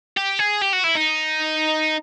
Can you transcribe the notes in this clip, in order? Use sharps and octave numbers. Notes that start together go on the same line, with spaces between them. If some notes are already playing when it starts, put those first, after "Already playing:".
G4
G#4
G4
F#4
E4
D#4